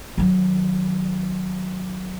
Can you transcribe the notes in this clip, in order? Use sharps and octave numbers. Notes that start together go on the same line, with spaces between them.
D#3 F#3